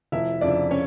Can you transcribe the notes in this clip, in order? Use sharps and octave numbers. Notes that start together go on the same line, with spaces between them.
F1 E4 E5
F2 C#3 D4 D5
C#4 C#5